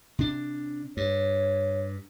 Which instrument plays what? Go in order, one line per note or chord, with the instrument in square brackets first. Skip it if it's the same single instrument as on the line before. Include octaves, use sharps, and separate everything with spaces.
[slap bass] C3 D4
[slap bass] G2 [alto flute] C#5